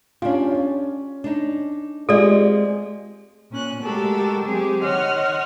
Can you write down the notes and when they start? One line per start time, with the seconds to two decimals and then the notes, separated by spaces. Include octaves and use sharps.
0.22 C#4 D4 F4 G4
0.52 C#4
1.24 D4 D#4
2.09 G#3 C4 F4 G4 A4 D5 D#5
3.50 A#2 C#4 F#6
3.83 G#3 A3 F#4 G4 A4 A#4
4.44 F#3 G#3 C4 G4 G#4
4.82 D#3 C#5 D#5 F#5 C6 F6